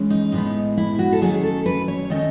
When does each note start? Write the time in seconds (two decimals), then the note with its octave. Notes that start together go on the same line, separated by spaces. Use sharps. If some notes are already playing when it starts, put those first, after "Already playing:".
Already playing: E3 G#3 C#4
0.10 D#4
0.32 A2 G#3 B3
0.77 E4
0.99 F#4
1.13 A4
1.21 D#3 F#3 A3 C#4 G#4
1.34 G#4
1.43 A4
1.66 B4
1.88 C#5
2.10 D#3 A3 C#4 D#5